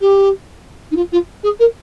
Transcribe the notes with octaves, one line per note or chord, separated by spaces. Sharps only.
G4
D#4
F4
F4
G#4
A#4